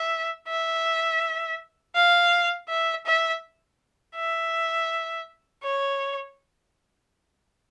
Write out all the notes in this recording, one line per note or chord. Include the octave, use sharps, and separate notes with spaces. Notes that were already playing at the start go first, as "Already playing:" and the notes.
Already playing: E5
E5
F5
E5
E5
E5
C#5